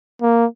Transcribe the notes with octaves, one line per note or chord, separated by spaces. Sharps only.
A#3